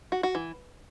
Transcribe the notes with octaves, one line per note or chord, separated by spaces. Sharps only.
F#4
F#4
E3